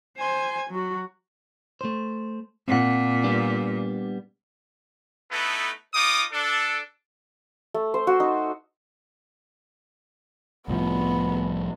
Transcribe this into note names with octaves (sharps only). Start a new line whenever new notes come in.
C5 G#5
F#3 F#4
A3 C5
A#2 C4 F#5
G3 B3 D4
A3 B3 D#4 E4 A4 B4
D#4 F4 D6 D#6
D4 A4
A3
C5
F#4
D#4
C2 A2 F3 B3